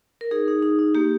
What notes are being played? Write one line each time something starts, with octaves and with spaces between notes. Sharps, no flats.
A#4
D#4 G#4
D#4
D#4
D#4
A#3 G4